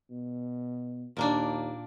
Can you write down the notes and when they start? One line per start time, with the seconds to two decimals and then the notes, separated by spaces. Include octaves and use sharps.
0.11 B2
1.17 D#2 A#2 A#3 D4